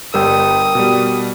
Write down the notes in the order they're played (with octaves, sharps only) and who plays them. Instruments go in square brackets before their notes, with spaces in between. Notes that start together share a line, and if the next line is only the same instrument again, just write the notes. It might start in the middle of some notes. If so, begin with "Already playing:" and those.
[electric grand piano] G1 G3 E6 [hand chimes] A#4 G5 [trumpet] D#6
[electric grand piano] B2 G3